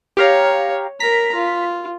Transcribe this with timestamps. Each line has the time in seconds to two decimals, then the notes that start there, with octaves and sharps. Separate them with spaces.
0.17 G4 C#5 F5 A#5
1.00 A#4 A#5 B6
1.35 F4